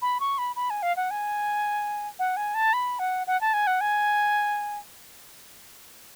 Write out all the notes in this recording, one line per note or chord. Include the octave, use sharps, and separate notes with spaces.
B5
C#6
B5
B5
G#5
F5
F#5
G#5
F#5
G#5
A5
B5
F#5
F#5
A5
G#5
F#5
G#5